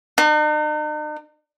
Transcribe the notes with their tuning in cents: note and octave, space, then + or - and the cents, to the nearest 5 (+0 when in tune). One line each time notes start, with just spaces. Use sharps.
D#4 -45